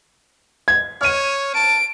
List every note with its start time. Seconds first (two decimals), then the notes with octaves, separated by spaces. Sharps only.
0.68 G#6
1.01 C#5 F6 D#7
1.55 A5 D7